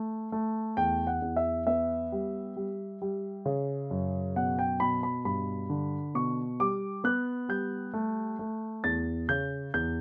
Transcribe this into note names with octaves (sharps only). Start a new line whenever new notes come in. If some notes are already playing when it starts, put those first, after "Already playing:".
Already playing: A3
A3
E2 G5
F#5
E2
E5
B3 E5
G3
G3
G3
C#3
F#2
B2 F#5
G5
B2 B5
B5
G2 B5
D3
B2 C#6
G3 D6
B3 F#6
G3 G6
A3
A3
E2 A6
C#3 G6
E2 G6